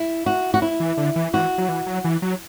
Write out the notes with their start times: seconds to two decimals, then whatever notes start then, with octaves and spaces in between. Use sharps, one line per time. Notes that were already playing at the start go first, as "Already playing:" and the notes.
Already playing: E4
0.26 F#4
0.54 F#4
0.62 E4
0.80 E3
0.97 D3
1.16 E3
1.33 E3 F#4
1.58 F#3
1.69 E3
1.86 F#3
2.04 E3
2.22 F#3